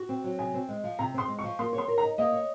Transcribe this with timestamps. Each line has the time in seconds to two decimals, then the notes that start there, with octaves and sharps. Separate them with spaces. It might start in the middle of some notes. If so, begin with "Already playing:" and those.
Already playing: F#4
0.09 C4
0.24 F#3
0.38 C3 G#5
0.54 C4
0.69 G#3
0.84 F3
0.99 C3 A#5
1.14 C4 C6
1.28 G#3
1.39 C#6
1.44 F3
1.59 A#3 C6
1.73 C#5
1.78 C6
1.88 A#4
1.98 A#5
2.03 D#4
2.18 A#3 D#5
2.33 C#5